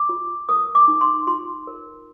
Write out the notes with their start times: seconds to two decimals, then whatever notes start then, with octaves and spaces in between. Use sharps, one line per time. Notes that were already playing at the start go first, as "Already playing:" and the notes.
Already playing: D6
0.09 F4
0.49 A#4 D#6
0.75 D6
0.88 D#4
1.01 C6
1.27 F4 C6
1.67 A#4